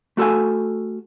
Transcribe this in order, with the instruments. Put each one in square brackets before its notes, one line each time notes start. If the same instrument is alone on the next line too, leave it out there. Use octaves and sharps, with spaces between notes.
[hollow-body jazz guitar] A3 F#4 A4 F5 G#5